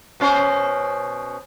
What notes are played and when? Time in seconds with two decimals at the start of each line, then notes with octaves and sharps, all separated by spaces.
0.20 B2 C#4 C5